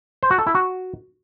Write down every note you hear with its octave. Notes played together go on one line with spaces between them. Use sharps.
C5
F#4
A4
E4
F#4